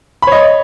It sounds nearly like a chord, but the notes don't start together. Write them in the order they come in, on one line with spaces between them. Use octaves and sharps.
B5 C#5 D#5